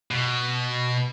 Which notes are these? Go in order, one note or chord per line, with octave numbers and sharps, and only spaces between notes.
B2